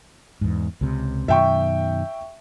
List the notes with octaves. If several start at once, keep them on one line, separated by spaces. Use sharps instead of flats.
E2 G#2
C#2 C3
F#2 B2 D#3 E5 G5 C#6